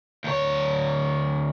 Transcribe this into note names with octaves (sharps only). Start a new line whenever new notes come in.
D2 C#5